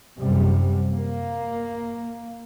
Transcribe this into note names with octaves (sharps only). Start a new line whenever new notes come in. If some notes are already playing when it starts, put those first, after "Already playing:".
F#2 C3 G3
A#3